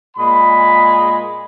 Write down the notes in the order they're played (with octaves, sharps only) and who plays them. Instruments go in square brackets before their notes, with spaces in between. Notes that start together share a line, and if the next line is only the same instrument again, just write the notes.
[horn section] A#2 G#3 B5